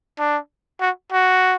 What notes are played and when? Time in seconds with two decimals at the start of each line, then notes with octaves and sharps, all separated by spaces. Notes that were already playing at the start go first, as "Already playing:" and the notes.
0.19 D4
0.81 F#4
1.12 F#4